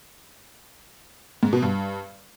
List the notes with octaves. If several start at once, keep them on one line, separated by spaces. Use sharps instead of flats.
G#2
B2
G2